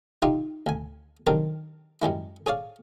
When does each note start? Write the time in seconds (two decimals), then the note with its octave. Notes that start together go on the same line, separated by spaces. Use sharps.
0.22 D#4 F4 G4 E5 C6
0.66 D2 G#5
1.27 D#3 F#3 G3 C4 D4 A#4
2.02 F#2 G3 G#3 E4
2.46 G#4 C#5 D5 F5